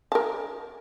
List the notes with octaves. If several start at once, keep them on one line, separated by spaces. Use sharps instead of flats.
A#4 A5